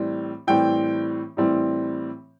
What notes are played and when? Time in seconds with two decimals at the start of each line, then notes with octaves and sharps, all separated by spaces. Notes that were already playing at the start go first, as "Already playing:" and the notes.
Already playing: A2 E3 G3 C4
0.47 A2 E3 G3 C4 G5
1.37 A2 E3 G3 C4